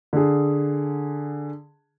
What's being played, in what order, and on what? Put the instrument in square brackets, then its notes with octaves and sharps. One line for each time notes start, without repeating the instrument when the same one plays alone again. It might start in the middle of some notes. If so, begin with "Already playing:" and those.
[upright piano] D3 G#4